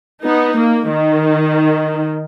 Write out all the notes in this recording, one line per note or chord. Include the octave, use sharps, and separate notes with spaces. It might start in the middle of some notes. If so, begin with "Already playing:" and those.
B3 D#4
A#3
D#3